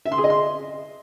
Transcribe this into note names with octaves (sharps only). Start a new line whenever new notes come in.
E5
C6
G#4
D#5
C6